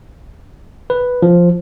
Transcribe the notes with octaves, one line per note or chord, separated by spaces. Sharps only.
B4
F3